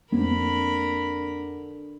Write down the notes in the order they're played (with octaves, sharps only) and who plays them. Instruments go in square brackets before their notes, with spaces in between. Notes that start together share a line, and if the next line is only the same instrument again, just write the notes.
[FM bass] F2 [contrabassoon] D3 [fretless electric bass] A#3 C4 [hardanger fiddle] A#4 B5